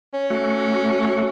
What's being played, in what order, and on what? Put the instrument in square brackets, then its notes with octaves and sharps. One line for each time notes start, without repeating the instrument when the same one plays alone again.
[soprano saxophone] C#4
[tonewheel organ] A3 F#4